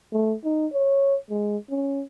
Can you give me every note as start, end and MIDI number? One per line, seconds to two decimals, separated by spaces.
0.12 0.35 57
0.44 0.67 63
0.73 1.16 73
1.30 1.57 56
1.70 2.03 61